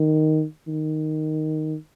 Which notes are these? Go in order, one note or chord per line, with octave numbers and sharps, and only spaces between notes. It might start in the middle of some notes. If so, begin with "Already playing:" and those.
Already playing: D#3
D#3